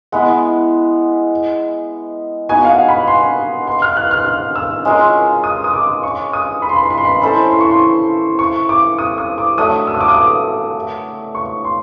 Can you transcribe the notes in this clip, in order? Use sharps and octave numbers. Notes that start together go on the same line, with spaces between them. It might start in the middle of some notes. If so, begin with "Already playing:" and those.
G#3 B3 E4 F#5
B3 D#4 F#4 G#5
F5
F#5
B5
C6
C6
F6
F#6
F6
F6
E6
G#3 C#4 F4 A#4
D#6
D#6
D6
C#6
D#6
B5
C6
B5
C6
B5
C6
B5
C#4 E4 A4 C5 B5
C6
C#6
C6
C#6
D6
D#6
D#6
D6
F#3 A3 D4 D#6
E6
D#6
D6
D#6
D6
C#6
C6